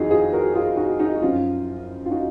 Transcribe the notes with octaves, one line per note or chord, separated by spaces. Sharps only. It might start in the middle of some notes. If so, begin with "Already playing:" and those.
Already playing: F2 D#3 D#4 F4 F#4 G#4
F4 G#4
F#4 A#4
F4 G#4
D#4 F#4
D#4 F#4
F#4
F#2 F3 C#4 F4
F4
D#4 F#4